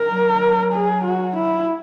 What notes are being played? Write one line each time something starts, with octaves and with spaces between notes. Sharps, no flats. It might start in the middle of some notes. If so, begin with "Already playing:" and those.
Already playing: A#4
F#3
G#4
F#4
E4